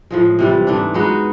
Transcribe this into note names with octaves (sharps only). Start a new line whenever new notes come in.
A2 F3 G#3
C3 E3 G3
G#2 E3 A3 D4
G#3 B3 D#4 F#4